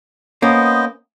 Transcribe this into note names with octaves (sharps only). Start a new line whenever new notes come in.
A#3 B3 C#4 C5 D#5